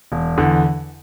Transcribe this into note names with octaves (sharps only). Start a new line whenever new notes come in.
E1
E2 D3